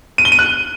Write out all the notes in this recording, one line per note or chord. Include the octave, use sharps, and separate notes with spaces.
D#7
G7
D#7
F#6